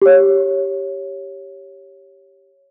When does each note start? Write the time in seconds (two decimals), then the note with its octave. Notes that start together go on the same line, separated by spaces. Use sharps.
0.02 G4 C#5